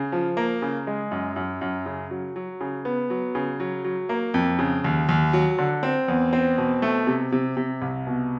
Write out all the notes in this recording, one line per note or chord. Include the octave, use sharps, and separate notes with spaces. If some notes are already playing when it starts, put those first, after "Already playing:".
Already playing: C#3
F3
A#3
C#3
G#3
F#2
F#2
F#2
C#3
F#3
F#3
C#3
B3
F#3
C#3
F#3
F#3
A#3
F2
C#3
D#2
D#2
F#3
D3
C4
E2
C4
B2
A3
C3
C3
C3
C2
B2